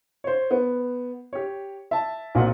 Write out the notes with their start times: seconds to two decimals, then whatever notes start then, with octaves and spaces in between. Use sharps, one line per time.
0.24 C5 C#5
0.51 B3
1.33 G4 C#5
1.91 E5 A5
2.35 B1 A#2 C4 F#5